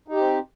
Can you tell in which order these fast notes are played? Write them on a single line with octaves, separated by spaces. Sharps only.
D#4 G4 C4